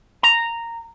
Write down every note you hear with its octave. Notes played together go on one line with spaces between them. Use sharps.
A#5